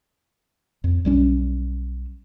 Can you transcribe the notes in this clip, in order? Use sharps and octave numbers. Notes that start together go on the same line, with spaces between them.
F2
B1 G3 C#4